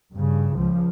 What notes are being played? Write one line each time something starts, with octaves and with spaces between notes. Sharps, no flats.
G2 C#3
C#2 F3